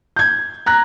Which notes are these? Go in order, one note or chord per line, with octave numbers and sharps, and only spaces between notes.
G6 G#6
A#5 F#6 A#6